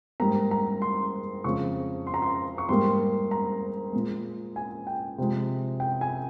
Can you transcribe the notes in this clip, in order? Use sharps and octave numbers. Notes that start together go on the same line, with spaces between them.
G#2 G3 A#3 A#5
A#5
C6
F2 C#3 G#3 C#6
C6
A#5
C6
C#6
G#2 G3 A#3 C6
A#5
A#2 G#3
G#5
G5
C3 F3 G#3
G5
G#5